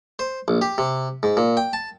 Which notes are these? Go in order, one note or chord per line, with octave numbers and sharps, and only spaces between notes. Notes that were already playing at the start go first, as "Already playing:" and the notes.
C5
A#1
G4
C3
G#2
A#2
G5
A5